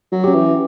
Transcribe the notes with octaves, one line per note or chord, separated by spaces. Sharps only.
F#3
C#4 G4
E3